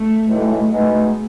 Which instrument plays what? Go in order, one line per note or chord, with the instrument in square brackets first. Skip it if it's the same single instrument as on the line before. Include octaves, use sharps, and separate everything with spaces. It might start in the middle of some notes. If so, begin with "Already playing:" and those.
Already playing: [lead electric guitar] A3
[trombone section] B1 A2 E3 G#3
B2 G#3 B3 D#4 G#4